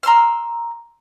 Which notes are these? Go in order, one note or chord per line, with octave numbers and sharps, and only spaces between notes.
A#5 C6 E6 F6